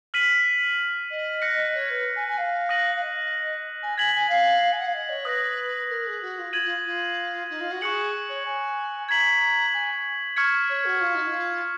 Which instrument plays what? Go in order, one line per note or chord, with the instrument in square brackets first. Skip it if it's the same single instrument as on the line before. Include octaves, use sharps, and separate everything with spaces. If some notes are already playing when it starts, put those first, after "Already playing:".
[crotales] F6 B6 D#7 F#7
[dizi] D#5
[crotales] F#6 A#6 C#7
[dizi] C#5
B4
G#5
G#5
F5
[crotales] D#6 F#6 A#6 D#7 F#7
[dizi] F5
D#5
G#5
[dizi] G#5 [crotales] G#6 B6 F#7
[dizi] G#5
F5
G#5
F#5
F5
D#5
C#5
[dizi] B4 [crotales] D#6 F#6 A#6
[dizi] A#4
G#4
F#4
F4
[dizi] F4 [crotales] G#6 D#7 F#7
[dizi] F4
F4
D#4
F4
F#4
[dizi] G#4 [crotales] C#6 F#6 C#7 F#7
[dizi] C#5
G#5
[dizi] A#5 [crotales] G#6 B6 F#7
[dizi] G#5
[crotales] C#6 F6 G#6 C#7
[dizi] C#5
F#4
F4
D#4
F4